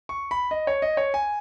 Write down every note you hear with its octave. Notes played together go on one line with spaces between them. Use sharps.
C#6
B5
D#5
C#5
D#5
C#5
G#5